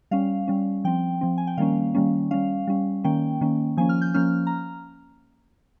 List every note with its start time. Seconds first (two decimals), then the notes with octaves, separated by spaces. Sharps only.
0.11 G3 C#4 F5
0.48 G3 C#4
0.84 F3 C4 G5
1.21 F3 C4
1.38 G#5
1.47 G5
1.57 D#3 G3 A#3 C#4 F5
1.95 D#3 G3 A#3 C#4
2.31 G3 C#4 F5
2.67 G3 C#4
3.04 D#3 A#3 C#4 G5
3.41 D#3 A#3 C#4
3.77 F3 A#3 C#4 G#5
3.89 F6
4.02 G6
4.14 F3 A#3 C#4 F6
4.47 A#5